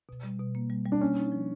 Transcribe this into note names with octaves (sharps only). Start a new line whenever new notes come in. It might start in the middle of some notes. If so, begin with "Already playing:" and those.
B2
G3
B2
A#3
G3
G3
D4
A#3 C#4
D#4
F3